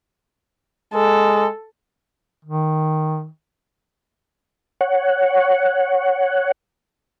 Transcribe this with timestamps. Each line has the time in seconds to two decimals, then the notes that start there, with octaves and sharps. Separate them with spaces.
0.94 G#3 A4
2.45 D#3
4.81 C#5 F#5